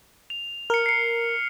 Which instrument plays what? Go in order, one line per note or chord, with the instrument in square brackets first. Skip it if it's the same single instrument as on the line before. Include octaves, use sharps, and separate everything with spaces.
[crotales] F7
[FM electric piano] A#4 [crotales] F6 C#7
[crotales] C7 C#7